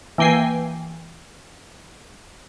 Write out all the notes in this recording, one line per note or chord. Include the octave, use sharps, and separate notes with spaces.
E3 A#3 G5 G#5 C7